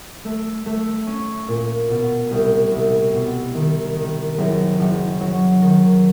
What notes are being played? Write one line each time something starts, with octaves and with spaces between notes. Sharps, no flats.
A3
A3
C#4
A#2
B2
C2
C2
B2
D#3
D#3
F#1
F#1
F#3
D#3